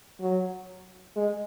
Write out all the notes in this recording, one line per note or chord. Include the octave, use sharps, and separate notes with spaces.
F#3
G#3